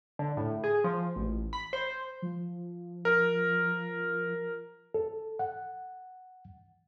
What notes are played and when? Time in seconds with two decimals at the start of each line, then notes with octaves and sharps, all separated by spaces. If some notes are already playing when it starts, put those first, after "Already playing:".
0.19 D3
0.37 A2
0.64 G#4
0.84 F3
1.16 A1
1.53 B5
1.73 C5
2.22 F3
3.05 A#4
4.94 A4
5.39 F#5